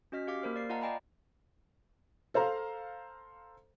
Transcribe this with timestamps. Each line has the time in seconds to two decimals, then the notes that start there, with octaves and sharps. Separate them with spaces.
0.12 C#4 F#4 D#5 F6 B6
0.27 G4 F5 D6 B6
0.42 A#3 A#4 C5 F6
0.56 D5 C7
0.69 F4 D#5 F5 F#5 A5 A#5
0.81 D5 D#5 G5 G#5 A#5 B5
2.34 A4 C5 F5 A#5